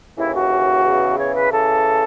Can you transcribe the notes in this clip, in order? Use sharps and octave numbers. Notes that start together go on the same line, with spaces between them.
D#2 C#3 E3 E4
F#4
E2 C#3 E3
C#5
B4
C#3 E3 A4